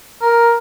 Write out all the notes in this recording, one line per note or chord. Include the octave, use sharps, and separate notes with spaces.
A#4